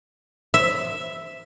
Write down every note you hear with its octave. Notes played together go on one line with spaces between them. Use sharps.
E5